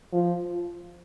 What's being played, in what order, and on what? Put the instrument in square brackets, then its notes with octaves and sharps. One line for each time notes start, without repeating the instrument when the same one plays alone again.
[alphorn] F3